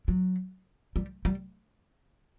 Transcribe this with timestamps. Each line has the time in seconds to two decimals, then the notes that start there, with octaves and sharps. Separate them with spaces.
0.08 F#3
0.96 G3
1.25 G3